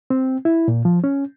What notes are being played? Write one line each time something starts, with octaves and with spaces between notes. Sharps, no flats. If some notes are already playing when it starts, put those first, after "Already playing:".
C4
E4
A#2
F3
C#4